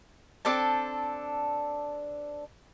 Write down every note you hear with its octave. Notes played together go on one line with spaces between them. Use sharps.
C4 D4 A4 A5